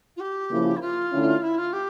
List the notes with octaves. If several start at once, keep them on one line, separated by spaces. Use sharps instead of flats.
F4
G4
C#3 F3 A#3 E4
E4
F4
D3 A3 C#4 E4
E4
F4
G4